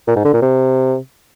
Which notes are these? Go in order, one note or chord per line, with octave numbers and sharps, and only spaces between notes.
A#2
G#2
D3
A#2
C3